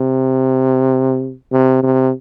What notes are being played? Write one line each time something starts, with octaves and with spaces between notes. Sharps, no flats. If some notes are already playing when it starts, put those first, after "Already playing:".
Already playing: C3
C3
C3